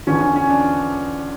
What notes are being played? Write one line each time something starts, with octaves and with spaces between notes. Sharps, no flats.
E2 D3 F3 C#4
C#4
C#4
D4